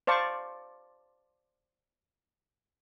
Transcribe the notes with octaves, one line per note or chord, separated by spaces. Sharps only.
C5 D5 F5 A5 C#6